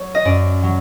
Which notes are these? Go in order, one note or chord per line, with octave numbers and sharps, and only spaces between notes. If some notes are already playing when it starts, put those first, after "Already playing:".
Already playing: F#3 C#5
D#5
F#2 D5
F#3